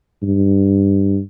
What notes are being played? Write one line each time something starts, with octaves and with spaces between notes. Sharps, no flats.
G2